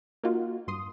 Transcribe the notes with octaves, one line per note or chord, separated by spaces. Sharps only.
A#3 D#4 F4 F#4
G2 C6 D#6